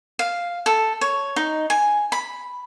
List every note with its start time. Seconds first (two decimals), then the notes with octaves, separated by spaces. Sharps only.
0.19 F5
0.66 A4
1.01 C#5
1.36 D#4
1.70 G#5
2.12 B5